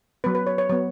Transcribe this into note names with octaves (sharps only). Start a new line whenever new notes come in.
F#3 B3 B4
B4
C#5
C#5
F#3 B3 C#5